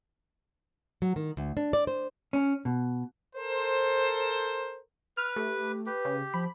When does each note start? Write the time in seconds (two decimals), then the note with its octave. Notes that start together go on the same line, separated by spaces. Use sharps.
1.02 F#3
1.16 D#3
1.37 D2
1.57 D4
1.73 D5
1.87 C5
2.33 C#4
2.65 B2
3.36 A4 A#4 C5
5.17 B4 F6
5.36 A3 G4
5.86 G4 B4
6.05 C#3
6.34 F3 B5